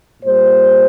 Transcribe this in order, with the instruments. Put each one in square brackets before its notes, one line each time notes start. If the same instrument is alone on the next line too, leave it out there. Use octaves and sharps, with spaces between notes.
[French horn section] A#2 G3 C5